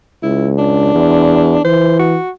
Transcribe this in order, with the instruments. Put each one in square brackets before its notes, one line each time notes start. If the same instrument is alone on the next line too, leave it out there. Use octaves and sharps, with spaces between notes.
[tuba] C#2 [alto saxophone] E4
[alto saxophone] D4
[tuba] E2
[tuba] E3 [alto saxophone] C5
[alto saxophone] F#4